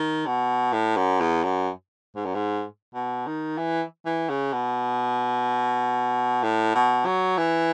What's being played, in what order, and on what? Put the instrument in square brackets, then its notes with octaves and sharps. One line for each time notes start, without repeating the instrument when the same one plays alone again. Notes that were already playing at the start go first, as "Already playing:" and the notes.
Already playing: [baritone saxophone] D#3
B2
A2
F#2
E2
F#2
G#2
F#2
G#2
B2
D#3
E3
E3
C#3
B2
A2
B2
F#3
E3